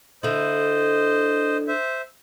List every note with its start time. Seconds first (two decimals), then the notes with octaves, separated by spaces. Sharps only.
0.23 D3 E4 C5 D#5
1.68 C5 E5